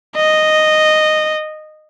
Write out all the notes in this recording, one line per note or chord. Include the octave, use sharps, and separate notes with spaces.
D#5